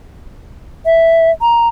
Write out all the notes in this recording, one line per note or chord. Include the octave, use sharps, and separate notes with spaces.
E5
A#5